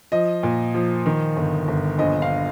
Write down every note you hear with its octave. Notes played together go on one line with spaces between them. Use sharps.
F3 D#5
A#2
F3
D#3
G1
G1
A#1 D#5
F5